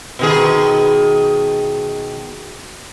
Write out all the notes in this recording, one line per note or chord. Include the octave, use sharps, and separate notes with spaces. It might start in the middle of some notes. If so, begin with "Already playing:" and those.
B2 D#3 G#4